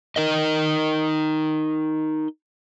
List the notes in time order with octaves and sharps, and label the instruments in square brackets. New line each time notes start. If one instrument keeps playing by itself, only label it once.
[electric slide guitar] D#4 A#4 D#5